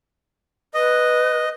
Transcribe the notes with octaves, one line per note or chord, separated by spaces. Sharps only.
B4 D#5